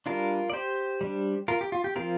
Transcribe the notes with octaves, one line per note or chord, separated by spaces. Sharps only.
G3 D4 F4 A#4
D5
G4 C5
G3 D4
F4 A#4
G4
F4
G4
F3 C4 F4 A#4